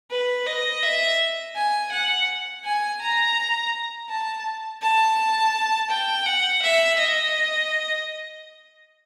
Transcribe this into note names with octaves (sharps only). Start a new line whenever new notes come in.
B4
D#5
E5
G#5
F#5
G#5
A#5
A5
A5
G5
F#5
E5
D#5